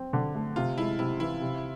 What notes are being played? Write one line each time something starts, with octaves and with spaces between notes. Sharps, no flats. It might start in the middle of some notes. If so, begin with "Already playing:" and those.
Already playing: C4
D3
A3
C3 F4
G#3 E4
C3 E4
E3 E4
C3